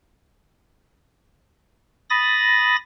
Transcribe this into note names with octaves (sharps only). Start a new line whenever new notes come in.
B5 D#6 A6 A#6